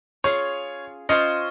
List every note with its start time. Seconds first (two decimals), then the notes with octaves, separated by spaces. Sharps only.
0.24 C#4 F4 G#4 C#5
1.09 C#4 F4 C5 D#5